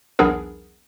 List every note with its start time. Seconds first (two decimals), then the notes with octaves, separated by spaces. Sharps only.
0.19 B1 E2 B3 D4 G#4 A#4